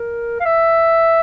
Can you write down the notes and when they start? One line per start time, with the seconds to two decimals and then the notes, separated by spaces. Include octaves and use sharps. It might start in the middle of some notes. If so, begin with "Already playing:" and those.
Already playing: A#4
0.40 F5
0.45 E5